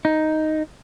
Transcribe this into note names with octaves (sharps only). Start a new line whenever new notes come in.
D#4